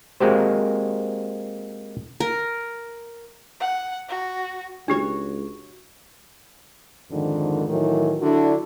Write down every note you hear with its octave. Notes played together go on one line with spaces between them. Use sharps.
G#3 A#3 C4 F#4 G4 C5
A#4
F#5
F#4
C#2 D4 F#4 G4 C#5
F2 G#2 D3 D#3
A2 D#3 E3 F#3
D3 F#3 D4 E4 F#4